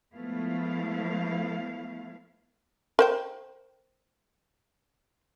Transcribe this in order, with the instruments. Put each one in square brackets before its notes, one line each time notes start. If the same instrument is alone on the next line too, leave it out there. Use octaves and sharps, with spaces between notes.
[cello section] F3 G#3 A3 B3 E4 F5
[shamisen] A#4 C5 G5